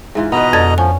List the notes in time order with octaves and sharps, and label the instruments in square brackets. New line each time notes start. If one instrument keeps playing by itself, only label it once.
[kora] G#2 E3 F4
[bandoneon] B2 D#5 A#5 [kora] B3 B4
[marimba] F2 A6 [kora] D3
[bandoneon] F3 [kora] C#4 [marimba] G#5